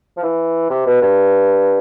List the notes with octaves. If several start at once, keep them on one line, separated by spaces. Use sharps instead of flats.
F3
E3
C3
B2
G2